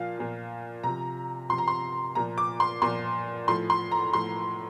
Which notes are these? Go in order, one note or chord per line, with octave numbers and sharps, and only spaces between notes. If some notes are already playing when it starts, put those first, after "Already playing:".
Already playing: A#2 F3 F5
A#2 F3
C3 F3 A#5
C3 F3 C6
A#5
C6
A#2 F3 A#5
D6
C6
A#2 F3 C6
A2 F3 C6
C6
A#5
A2 F3 C6